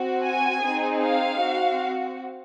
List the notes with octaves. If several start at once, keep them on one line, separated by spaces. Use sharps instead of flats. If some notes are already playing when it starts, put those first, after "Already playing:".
Already playing: C4 F#4
G#5
C4 D#4 G#4
F5
C4 F#4